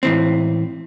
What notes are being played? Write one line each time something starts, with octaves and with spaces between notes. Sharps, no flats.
A2 E3 C4